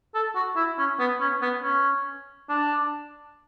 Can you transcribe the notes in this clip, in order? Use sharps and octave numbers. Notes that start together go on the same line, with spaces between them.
A4
F#4
E4
C#4
B3
C#4
B3
C#4
D4